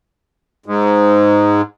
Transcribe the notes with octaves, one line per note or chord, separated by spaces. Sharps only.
G#2